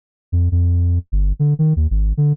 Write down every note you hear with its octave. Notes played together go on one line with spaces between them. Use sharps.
F2
F2
G1
D3
D#3
D#2
G#1
D3